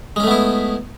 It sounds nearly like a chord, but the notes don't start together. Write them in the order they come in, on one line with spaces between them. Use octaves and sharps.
G#3 C#4 A3 B3 E4